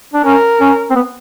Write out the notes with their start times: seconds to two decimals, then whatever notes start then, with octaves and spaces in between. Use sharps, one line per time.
0.14 D4
0.24 C#4 A#4
0.60 C#4
0.90 C4
0.95 B3